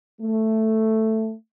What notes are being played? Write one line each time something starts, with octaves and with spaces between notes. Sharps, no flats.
A3